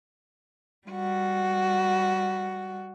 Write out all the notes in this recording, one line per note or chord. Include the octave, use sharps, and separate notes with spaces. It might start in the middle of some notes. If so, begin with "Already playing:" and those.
G3 F#4